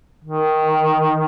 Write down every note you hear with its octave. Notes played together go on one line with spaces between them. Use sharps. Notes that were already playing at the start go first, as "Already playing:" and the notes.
D#3